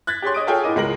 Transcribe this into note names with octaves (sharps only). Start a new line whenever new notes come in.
F#6 G#6 A6 B6
G4 G#4 C#5 C6
C#5 D#5 D#6 D7
F4 G#4 A4 C#5 G5 G#5
A2 A#4 D#5 D6 D#7
C#2 G#3 A#4 A#6 F#7